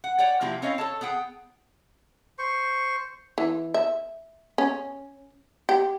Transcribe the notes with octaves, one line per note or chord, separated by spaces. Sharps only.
F#5
C#5 D5 F#5 G5
C3 F3 A#3 C4 E4 G4
C4 C#4 E4 C#5 D#5 F5
A4 C#5 A5
B3 G#4 F#5 G5
C5 C#6
E3
E5
C#4
G4